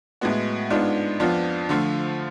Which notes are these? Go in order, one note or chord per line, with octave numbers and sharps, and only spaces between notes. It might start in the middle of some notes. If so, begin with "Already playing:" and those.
A2 G#3 B3 F#4
G#2 G#3 B3 D4 F4
F2 F3 B3 D4 F4
D3 F3 A3 F4